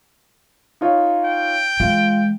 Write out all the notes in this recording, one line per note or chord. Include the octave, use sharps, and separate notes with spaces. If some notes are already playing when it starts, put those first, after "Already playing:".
D#4 F4 C#5
G5
E3 G#3 F4